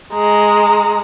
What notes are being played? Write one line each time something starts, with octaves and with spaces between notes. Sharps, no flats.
G#3 A#5